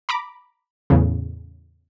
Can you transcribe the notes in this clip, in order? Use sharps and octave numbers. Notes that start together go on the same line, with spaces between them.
A#5 B5 D6
E2 A2 C#3